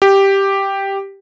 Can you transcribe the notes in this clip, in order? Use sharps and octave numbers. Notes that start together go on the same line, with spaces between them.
G4